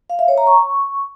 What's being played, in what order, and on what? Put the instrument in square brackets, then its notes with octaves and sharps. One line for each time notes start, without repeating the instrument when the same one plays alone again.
[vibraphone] F5
E5
C#5
A#5
C#6